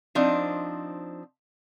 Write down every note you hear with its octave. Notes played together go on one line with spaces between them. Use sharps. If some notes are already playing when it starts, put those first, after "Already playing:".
F3 C4 D4 D#4